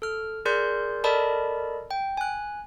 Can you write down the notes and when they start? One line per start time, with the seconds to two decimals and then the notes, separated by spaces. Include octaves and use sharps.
0.02 A4 F6
0.45 G#4 A#4 D5 C6 F#6 G6
1.04 A4 A#4 D5 D#5 A5 B5
1.91 G5
2.17 G#5 F#6